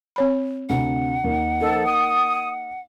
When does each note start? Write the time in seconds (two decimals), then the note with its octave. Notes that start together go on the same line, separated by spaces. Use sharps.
0.16 C4 C#5 B5
0.69 D2 C3 F#5
1.24 D#2 A#3 D#4
1.61 F3 A#3 D#4 A4 D#5
1.86 D#6